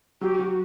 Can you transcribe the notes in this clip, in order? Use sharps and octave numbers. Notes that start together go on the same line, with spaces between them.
F#3 G4
F#3 F#4